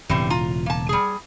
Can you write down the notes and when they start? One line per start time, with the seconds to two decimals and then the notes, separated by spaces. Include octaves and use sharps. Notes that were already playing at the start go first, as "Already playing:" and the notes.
0.09 E1 A2 C#3 E3 G3 C4
0.30 F4 A#5
0.66 A#3 A5
0.89 G3 G#4